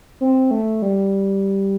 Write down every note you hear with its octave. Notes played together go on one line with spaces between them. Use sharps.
C4
A3
G3